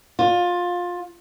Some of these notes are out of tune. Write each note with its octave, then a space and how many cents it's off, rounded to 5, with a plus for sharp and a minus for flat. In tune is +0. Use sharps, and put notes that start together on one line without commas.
F4 +20